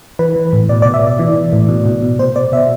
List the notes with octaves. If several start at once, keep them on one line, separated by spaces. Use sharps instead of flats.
E3 B4
E3
A2
B2 D5
B2 D5
E5
B2 D5
E3
E3
A2
B2
B2
B2
B2 C5
B2 D5
B2 E5